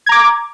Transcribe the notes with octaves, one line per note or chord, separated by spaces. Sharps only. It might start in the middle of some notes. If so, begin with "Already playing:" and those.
A#5 D6 G#6